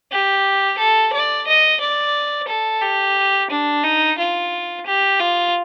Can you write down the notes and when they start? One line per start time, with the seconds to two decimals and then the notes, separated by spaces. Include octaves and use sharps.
0.12 G4
0.78 A4
1.13 D5
1.47 D#5
1.80 D5
2.48 A4
2.82 G4
3.51 D4
3.84 D#4
4.18 F4
4.86 G4
5.20 F4